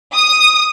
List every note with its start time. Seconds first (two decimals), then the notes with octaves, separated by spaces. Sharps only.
0.15 D#6